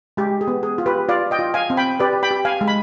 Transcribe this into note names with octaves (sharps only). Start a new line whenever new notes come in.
G#3 G4
G#4
B3
G#4
F4
G4 B4
F4 D5 F5
D#5 G5
F4
F5 G#5
C4
G5 B5
G4 B4 D5
G5 B5
G4
F5 G#5
G#3
B5